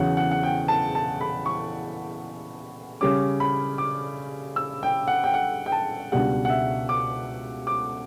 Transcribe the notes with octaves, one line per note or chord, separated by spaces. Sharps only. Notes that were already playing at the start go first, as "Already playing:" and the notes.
Already playing: E2 C#3 F#3 F#5
F#5
F#5
G5
A5
A5
B5
C#6
C#3 G3 C#4 D6
B5
D6
E6
G5
F#5
G5
F#5
G5
A5
C#2 B2 G3 D4 F#5
F#5
E5
D6
D6